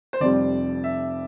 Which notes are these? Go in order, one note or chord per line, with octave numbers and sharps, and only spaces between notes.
C5
F1 F2 C3 G3 D5
E5